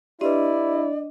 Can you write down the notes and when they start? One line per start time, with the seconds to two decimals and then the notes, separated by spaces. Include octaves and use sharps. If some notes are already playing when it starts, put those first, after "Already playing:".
0.21 D4 E4 G4 B4 D5 D#5